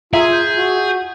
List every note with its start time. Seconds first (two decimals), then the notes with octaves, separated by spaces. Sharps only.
0.14 F4 G#4 E5 A#5
0.31 G6
0.58 F#4